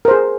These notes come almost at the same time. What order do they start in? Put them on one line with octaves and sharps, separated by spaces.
A#4 C5 G#4